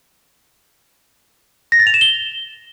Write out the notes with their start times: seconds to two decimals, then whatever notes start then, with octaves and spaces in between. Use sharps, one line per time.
1.72 A#6
1.79 A6
1.87 F7
1.94 E7
2.01 G7